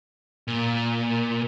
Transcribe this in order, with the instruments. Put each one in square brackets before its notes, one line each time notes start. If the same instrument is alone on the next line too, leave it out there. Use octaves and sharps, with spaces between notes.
[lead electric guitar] A#2